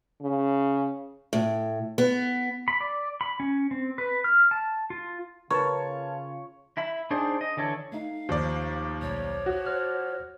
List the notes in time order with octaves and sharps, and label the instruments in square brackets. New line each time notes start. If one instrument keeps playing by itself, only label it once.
[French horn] C#3
[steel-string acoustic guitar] A2
B3
[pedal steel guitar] B5
D5
B5
C#4
C4
B4
F6
A5
F4
[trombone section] C#3 F4 [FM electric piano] A#4 B4 A5 [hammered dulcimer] C#5
[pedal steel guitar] E4 E5 B5
D4 D#4 G#4 C5 D5
D#5
D3 E3 A4 C#5
[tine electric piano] A3 D#4 [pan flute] F5
[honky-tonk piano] D#2 [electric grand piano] F3 D5
[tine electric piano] B1 [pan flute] C#5
[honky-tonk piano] F#4
[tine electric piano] C5 F6 F#6